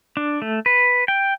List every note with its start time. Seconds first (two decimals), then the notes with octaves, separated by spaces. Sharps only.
0.17 D4
0.42 A3
0.66 B4
1.08 G5